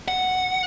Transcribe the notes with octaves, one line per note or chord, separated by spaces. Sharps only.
F#5